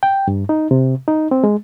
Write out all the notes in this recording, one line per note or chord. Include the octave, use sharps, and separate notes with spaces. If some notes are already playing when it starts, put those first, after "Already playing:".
G5
G2
D#4
C3
D#4
C4
G#3